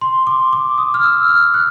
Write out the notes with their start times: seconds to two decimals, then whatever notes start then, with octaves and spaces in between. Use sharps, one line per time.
0.01 C6
0.27 D6
0.53 D6
0.78 D#6
0.94 F6
1.04 E6
1.28 F6
1.54 F#6